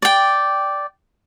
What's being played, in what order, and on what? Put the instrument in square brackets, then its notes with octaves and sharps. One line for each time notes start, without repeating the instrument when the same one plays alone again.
[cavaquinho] D5 G5